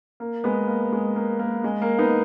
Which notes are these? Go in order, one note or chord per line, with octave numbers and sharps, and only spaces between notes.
A#3
G#3 B3
A#3
G#3
A#3
A#3
G#3
A#3
B3 D#4